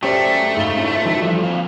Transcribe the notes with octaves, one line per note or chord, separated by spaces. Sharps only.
F#3 A3 C#4 G4 C5 D5
G#2 G#4 F5 G7
C#4 E4 F4
D#3 E3 F#3
F3 G3 A4
A#3 C4 F5